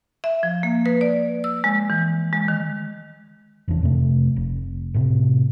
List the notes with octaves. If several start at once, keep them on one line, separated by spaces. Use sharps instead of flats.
E5
F3
A#3
B4
D5
E6
G#3
E3
G#3
D#3
F1 E2 D4
F2 C3 A3
F1
A2 C3